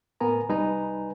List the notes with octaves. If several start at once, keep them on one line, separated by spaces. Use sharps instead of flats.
A2 B3 A#4 G#5 A#5
C2 G3 D#4 B4 G#5 A#5